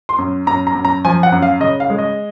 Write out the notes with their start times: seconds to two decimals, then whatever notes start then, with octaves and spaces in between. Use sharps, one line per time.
0.09 C6
0.18 F#2
0.47 F#2 A#5
0.67 A#5
0.75 F#2
0.85 A#5
1.05 F3 G#5
1.23 F#5
1.32 F#2
1.42 F5
1.60 C#3 D#5
1.80 F5
1.90 G#3
1.98 D#5